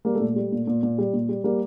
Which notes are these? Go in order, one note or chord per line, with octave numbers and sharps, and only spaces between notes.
G3 A#3
A3
A#2
G3 A3
A#2
A#2
A#2
G3
A#2
G3
G3 A#3